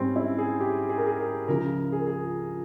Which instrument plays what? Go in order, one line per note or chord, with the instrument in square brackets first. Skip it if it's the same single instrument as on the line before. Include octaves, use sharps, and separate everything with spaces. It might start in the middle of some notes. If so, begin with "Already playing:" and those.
Already playing: [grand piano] G#2 G3 C4 C#4
E4
G#4
G4
G#4
A#4
G#4
A#4
C#2 C#3 F3 A#4
G#4
A#4
G#4